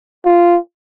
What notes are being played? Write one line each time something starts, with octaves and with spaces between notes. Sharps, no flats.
F4